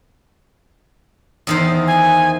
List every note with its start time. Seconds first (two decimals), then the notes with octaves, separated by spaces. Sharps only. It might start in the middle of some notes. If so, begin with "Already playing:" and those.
1.47 E2 D#3 C5
1.87 G#5